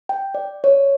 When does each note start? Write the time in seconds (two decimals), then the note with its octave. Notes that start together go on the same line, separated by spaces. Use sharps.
0.09 G5
0.35 D5
0.64 C#5